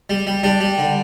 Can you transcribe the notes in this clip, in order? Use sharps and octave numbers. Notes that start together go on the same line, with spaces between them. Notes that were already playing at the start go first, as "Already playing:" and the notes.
G3
G3
G3 D4
G3
D3